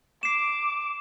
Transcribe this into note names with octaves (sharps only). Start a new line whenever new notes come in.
D6 C7 E7